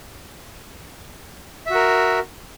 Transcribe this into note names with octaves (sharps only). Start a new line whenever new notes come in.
F#4 A#4 E5